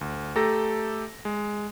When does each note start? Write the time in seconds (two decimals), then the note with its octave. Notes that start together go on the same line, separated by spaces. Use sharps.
0.01 D2
0.36 A3 G4 A4 A#5 A#6
1.25 G#3